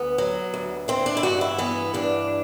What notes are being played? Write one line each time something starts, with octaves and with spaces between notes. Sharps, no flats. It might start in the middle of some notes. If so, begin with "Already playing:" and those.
Already playing: D2 B3
F#3
D2
E3 C4
D4
E4
G2 F#4
E4
E3 B3
G2 D4